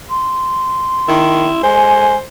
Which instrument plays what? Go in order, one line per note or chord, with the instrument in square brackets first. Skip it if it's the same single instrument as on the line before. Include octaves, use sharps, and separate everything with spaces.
[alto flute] C6
[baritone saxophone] D#3 [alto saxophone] E4
[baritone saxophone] G#3 [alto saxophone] C5 [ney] G#5